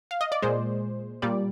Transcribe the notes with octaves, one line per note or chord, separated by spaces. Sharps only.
F5
D#5
D5
A#2 G#3 C5
A#2 G3 D5